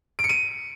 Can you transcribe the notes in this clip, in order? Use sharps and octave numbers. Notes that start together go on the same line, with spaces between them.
D7
C#7
D#7